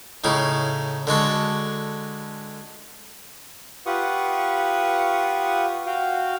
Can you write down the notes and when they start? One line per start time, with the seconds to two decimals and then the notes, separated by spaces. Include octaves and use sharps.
0.24 A2 C#3 D#4 E4
1.07 D3 G#3 F#4 A4
3.86 F4 G4 B4 F#5 C#6 D#6
5.86 F#4 F5 G5